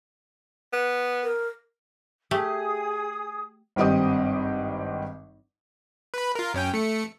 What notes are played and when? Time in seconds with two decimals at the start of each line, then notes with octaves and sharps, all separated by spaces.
0.73 B3
1.24 A#4
2.31 A3 G4 G#4 D#6
3.76 G#1 G2 C4 G4 D#5 D#6
6.14 B4 B5
6.35 F4 A#4
6.54 F#2 C#4 G5
6.74 A3 C#7